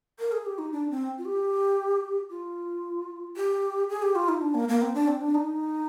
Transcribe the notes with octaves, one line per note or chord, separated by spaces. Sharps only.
A#4
G#4
G4
D#4
D4
C4
F4
G4
F4
G4
G#4
G4
F4
D#4
D4
A#3
A#3
C4
D4
C4
D4
D#4